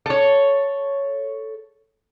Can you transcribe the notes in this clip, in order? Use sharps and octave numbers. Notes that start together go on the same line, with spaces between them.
A4 C#5